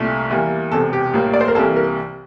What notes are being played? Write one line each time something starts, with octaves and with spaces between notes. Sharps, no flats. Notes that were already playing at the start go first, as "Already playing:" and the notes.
Already playing: C2 A#2 A3
E2 E3 G3 A#3
E1 E2 C3 A4
G4
A#1 A2 G3 A#3
D5
C5
A#4
C2 C3 E3 G3 A#3 A4
A#4